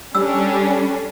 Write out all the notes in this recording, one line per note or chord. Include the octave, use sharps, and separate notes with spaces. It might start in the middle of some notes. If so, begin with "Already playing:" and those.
G3 C#4 D4 A4 E6